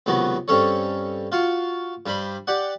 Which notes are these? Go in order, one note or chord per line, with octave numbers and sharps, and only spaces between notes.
C#2 C3 D#3 F#3 B3
G2 C4 C#4 A4 C#5
F4 F#4 F5 C#6
G2 G3 C5 B5
G4 D5 F#5